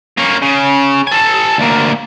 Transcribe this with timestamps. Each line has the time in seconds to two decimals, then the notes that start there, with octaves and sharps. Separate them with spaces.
0.17 A#3 C#4
0.42 C#3
1.07 A4 G#5
1.58 D2 A#3